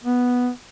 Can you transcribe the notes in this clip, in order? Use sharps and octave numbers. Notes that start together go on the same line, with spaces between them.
B3